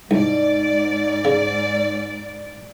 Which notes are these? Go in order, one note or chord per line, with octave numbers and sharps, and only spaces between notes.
C2 G#2 D#4 D5
C#3